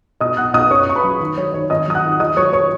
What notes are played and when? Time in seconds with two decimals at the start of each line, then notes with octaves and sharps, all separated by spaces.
0.20 B2 D#5 D#6
0.37 B1 F#5 F#6
0.54 B1 D#5 D#6
0.71 F#2 C#5 C#6
0.87 F#2 C#6
0.95 B4 B5
1.04 F#3
1.20 D#3
1.37 F#3 C#5
1.54 D#3 C#5
1.70 G#1 D#5 D#6
1.87 F#3 D#6
1.95 F#5 F#6
2.04 D#3
2.20 D#2 D#5 D#6
2.37 F#3 C#5 C#6
2.53 C#5 C#6